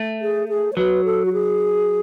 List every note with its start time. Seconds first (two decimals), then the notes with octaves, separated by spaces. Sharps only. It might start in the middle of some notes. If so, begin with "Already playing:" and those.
Already playing: A3
0.21 G#4
0.49 G#4
0.73 C#5
0.77 F#3 B4
1.05 A4
1.25 F#4
1.33 G#4